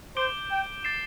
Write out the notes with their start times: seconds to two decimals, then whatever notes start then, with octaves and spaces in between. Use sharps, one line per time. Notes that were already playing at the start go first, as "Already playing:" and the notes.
0.16 C5 D6 G6 D7 G7
0.51 G5
0.84 D6 A6 C7 E7